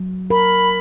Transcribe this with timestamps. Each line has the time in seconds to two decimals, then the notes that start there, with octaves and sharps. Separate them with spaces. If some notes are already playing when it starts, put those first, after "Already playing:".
Already playing: F#3
0.30 A#4 B5